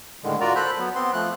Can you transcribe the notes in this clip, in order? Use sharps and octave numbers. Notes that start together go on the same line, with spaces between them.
A2 D3 D#3 G#3
F4 F#4 A#4 D5 A#5
A4 C5 B5 F#6
F#3 B3
B3 C4 C6
F3 A3 F#6